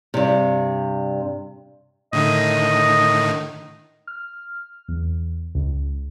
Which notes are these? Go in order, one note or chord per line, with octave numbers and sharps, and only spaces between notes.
G2 C3
A2 D3 D#3 D#5
F6
E2
C#2